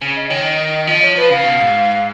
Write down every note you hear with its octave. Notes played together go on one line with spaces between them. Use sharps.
C#3
D#5
D#3 C#5
D#5
F3 D#5
C#5
F3 B4
C#3 F5
B2
G#2